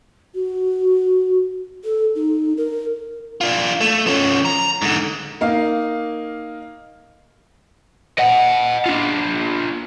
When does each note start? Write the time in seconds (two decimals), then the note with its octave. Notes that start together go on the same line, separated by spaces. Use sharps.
0.35 F#4
1.84 A4
2.15 D#4
2.57 A#4
3.41 D4 F4
3.81 A3
4.07 F3 C#4
4.45 A#5
4.82 G#2 D3
5.41 A#3 D#4 F5
8.19 D#5 F#5
8.86 D4 F4